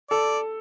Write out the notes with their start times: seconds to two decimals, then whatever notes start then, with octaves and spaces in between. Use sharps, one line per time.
0.10 A4 D5